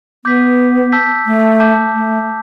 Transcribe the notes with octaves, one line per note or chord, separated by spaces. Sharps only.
B3 D6 G6 B6
A5 E6 G6 B6
A3
A5 D6 G6
A3